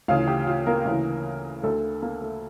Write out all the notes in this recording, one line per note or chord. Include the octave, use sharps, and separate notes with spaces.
D2 C#3 E3 F4 F5
G4 G5
F4 F5
A#3 A#4
D2 C#3 E3
D2 D3 A3 A4
A#3
A3